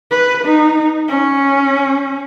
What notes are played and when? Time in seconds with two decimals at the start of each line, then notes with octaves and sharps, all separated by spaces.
0.11 B4
0.45 D#4
1.08 C#4